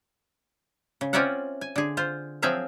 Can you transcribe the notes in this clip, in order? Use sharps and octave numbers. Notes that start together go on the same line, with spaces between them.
C#3
C4 C#4 F4 D5 E5 F#5
G#5
D3 G#4
F4 C5
F3 F#3 C4 G#4 E5 F5